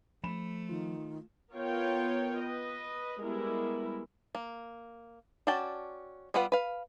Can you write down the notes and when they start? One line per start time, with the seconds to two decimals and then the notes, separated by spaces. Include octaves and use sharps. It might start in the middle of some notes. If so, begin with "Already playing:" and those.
0.24 F3 A3 B5 E7
0.69 D#3 F4
1.52 B3 F4 A#4 C#5 G5
2.40 B4 D#5
3.21 G3 G#3 B3 E4 A#4
4.35 A#3
5.47 C#4 F#4 D5 G5 A5
6.34 G3 B3 F4 B4 F#5
6.52 B4 F5